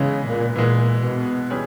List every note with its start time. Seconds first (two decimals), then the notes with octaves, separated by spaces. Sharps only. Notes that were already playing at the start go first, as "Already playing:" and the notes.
Already playing: C#3 E3 G#3 B3
0.25 A#2
0.56 A#2 E3 G#3 B3
1.03 B2
1.50 E3 G3 C#4 G#4